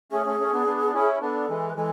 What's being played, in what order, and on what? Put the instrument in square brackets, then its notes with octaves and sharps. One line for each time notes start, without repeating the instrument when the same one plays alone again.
[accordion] A3 C#4 [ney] G#4
[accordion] A3 C#4
A3 C#4
B3 D4
B3 D4
D4
C#4 E4
[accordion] B3 D4 [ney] A4
[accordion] E3 G#3
[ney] B4
[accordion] E3 G#3 [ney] A4